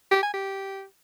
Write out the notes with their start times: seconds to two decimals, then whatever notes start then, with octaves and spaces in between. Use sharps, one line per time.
0.11 G4
0.23 G#5
0.34 G4